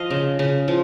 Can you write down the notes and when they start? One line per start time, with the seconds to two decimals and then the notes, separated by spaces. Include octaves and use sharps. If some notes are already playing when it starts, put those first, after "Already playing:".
Already playing: F3 D#5 F5
0.10 C#3
0.39 C#3
0.68 F3